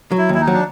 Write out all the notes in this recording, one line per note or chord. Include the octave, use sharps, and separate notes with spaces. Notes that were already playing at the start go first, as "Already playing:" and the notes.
F#3
E4
D#2
E4
D#4
F#3
D4